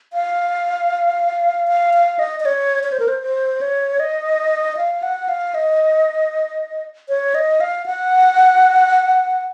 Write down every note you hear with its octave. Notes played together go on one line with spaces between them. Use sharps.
F5
F5
F5
D#5
D#5
C#5
C#5
C5
A#4
C5
C5
C#5
D#5
F5
F#5
F5
D#5
C#5
D#5
F5
F#5